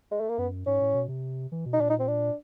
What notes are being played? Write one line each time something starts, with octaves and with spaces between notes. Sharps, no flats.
G#3
A3
A#3
F#2 B3
G#2 C#4
A2
B2
C3
E3
B2
D#4
A#2 D4
D#4
C4
D4